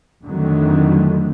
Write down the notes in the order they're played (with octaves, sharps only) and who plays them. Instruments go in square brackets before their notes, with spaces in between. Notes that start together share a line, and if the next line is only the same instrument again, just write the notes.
[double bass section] F2 D3 D#3 F#3 A3